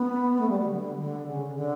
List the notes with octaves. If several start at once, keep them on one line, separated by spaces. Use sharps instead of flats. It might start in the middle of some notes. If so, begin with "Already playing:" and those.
Already playing: B3
A3
G3
F#3
D3
D3
C#3
D3